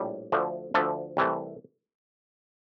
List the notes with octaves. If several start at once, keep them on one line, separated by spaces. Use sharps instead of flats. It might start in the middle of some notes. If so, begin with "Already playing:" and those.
Already playing: A#1 A2 G3
D2 D3 F3 A3
D2 D3 F3 A3 A4
C2 C3 E3 A3